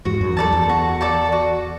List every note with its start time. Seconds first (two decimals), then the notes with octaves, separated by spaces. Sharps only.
0.05 E2 G#2 F#4
0.21 F#2
0.37 E2 A4 D5 A5
0.52 E2
0.69 F#4
1.01 A4 D5 A5
1.32 F#4